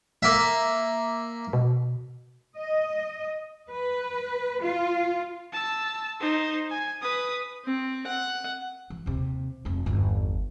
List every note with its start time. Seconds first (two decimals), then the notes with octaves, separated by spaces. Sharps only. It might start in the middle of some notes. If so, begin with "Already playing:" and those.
0.23 A#3 E5
1.53 B2
2.57 D#5
3.70 B4
4.62 F4
5.53 A5 E6
6.20 D#4 C5
6.70 G#5
7.02 B4 D#6
7.65 C4
8.07 F#5
8.90 E3
9.06 D#2 C3
9.65 F1 A3
9.86 G1 E2